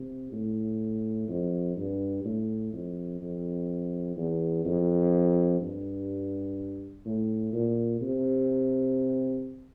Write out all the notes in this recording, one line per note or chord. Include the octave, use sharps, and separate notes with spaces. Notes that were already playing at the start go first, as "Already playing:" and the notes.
Already playing: C3
A2
F2
G2
A2
F2
F2
E2
F2
G2
A2
A#2
C3